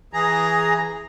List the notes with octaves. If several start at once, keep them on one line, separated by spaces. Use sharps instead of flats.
E3 G#4 A#5